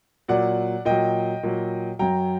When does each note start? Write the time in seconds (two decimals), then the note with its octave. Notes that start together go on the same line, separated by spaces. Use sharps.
0.28 A#2 F#3 D5 F#5
0.85 A#2 F#3 D#5 G5
1.43 A#2 F#3
1.99 F#2 F#3 G5 A#5